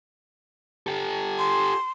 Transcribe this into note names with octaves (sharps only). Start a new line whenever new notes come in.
G4 A4
C6